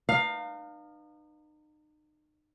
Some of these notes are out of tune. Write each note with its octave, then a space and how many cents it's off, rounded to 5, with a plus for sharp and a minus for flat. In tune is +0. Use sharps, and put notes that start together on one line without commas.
D#4 -35 B4 +0 F5 +15